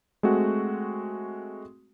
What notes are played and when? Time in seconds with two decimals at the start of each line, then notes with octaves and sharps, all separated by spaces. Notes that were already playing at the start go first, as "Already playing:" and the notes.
0.23 G#3 A3 C4 F#4